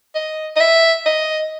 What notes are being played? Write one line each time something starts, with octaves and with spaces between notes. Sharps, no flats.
D#5
D#5
E5
D#5